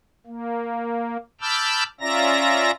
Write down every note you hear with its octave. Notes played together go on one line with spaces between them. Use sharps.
A#3
A5 B5 D6 E6 F6 G6
C#4 F4 D5 E5 A#5 A#6